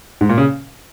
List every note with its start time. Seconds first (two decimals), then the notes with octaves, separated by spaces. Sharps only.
0.21 G#2
0.29 A#2
0.38 C#3